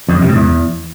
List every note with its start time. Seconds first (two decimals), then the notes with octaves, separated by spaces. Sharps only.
0.09 F2
0.15 F#2
0.22 C3
0.29 G#2
0.36 E2